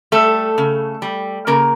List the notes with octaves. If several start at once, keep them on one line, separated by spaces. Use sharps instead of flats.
G3 A3 A4
C#3
G3
C#3 A#3 A#4